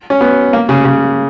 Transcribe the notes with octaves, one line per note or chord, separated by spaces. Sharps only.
C#4
B3
A#3
C#3
C#3